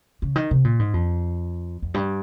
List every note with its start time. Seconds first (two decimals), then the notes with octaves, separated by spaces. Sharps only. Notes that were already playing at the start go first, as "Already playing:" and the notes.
0.22 C#3
0.36 D#3
0.51 C3
0.65 A#2
0.79 G#2
0.94 F2
1.82 F2
1.94 G2